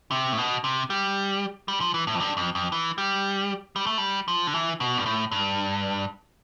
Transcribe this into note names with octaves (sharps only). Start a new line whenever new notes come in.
C3
A2
B2
C3
G3
G3
F3
E3
A2
F2
G2
F2
F2
E3
G3
G3
A3
G3
F3
D3
E3
B2
G2
A2
G2